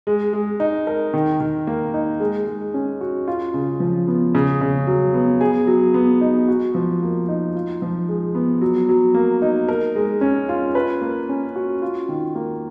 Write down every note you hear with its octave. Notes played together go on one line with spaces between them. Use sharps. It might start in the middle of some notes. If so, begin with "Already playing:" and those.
G#3
G#3
D#4
A#4
D#3
D#3
A#3
D#4
G#3
G#3
C#4
F#4
F4
C#3
F3
B3
C#3
C#3
F#3
B3
G#4
F#3
B3
D#4
F#4
F3
A#3
D#4
F4
F3
G#3
B3
F#3
F#3
A#3
D#4
A#4
G#3
C#4
F4
B4
A#3
C#4
F#4
F4
D#3
A#3